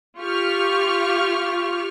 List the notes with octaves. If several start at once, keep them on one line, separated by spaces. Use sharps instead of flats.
F4 G4 C#6 F6